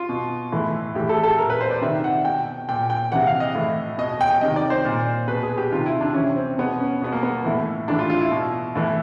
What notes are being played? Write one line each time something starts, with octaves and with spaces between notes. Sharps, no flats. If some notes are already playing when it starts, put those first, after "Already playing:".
Already playing: F4
B2
A2 E3
A2 E3 G4
A4
A4
A#2 A#4
B4
C5
D5
C3 D#3 E5
F#5
B2 G5
A#2 G5
G5
C3 E3 F#5
F5
D#5
A2 E3
B2 D#5
D#5
G5
G5
C3 D#3 D#5
D5
C5
A#2
B2 B4
G#4
G4
C3 D#3 F4
E4
D4
C3 E3 C#4
C4
B2 B3
C#4
B2 B3
A#3
B3
A2 E3
A2 E3 D4
F4
F4
E4
B2
A2 E3